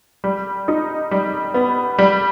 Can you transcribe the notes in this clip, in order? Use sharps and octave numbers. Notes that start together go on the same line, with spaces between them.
G3
D#4
G3
B3
G3